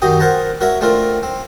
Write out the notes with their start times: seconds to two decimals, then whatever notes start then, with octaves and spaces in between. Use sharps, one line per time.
0.02 F#2 D#3 F#3 G4 D#6
0.20 A#4 C5 F#5 A5 A#5
0.61 F#4 A#4 C#5 E5 A#5
0.81 A3 C4 D4 F4 A#4
1.23 C4